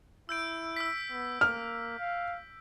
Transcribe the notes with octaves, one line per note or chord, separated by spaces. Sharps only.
E4 E6 G6 D7
E6 B6
B3
A#3 F6
F5